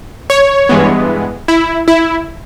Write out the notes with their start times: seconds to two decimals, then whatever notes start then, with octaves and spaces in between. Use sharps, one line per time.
0.30 C#5
0.69 G2 E3 G#3 B3
1.48 E4
1.88 E4